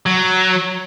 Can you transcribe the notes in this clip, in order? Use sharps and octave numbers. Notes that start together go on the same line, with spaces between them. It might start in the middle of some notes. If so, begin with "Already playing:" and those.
F#3